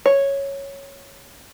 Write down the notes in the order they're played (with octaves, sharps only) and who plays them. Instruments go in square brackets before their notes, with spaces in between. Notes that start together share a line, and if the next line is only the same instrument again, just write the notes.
[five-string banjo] C#5